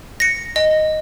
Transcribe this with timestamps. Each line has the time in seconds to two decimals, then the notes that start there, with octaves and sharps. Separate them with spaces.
0.20 A#6 C#7
0.56 D#5